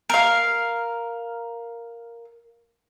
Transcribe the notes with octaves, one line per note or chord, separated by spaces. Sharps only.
A#4 F5